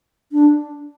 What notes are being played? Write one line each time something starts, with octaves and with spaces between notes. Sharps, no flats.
D4